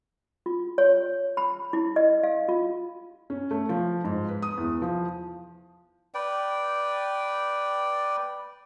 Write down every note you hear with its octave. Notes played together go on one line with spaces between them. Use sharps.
F4
C#5
B5
E4
D#5
F5
F4
C#4
A3
F3
G#2
B4
D#6
E2
F3
B4 D5 G5